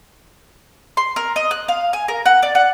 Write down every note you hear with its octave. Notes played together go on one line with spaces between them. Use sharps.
C6
A#4
D#5
F#6
F5
G#5
A#4
F#5
D5
F#5